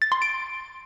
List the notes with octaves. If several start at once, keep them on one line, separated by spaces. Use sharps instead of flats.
A6
C6
D7